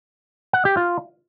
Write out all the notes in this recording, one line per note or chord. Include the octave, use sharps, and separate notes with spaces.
F#5
G4
F4